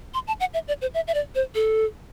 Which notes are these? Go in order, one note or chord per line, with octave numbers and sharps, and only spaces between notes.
C6
A5
F#5
E5
D5
C5
E5
E5
D5
C5
A4